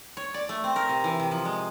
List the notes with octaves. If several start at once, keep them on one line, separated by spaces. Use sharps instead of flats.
C#5
D5
A3
C4
A#4
C3
E3
C3
F3
G#3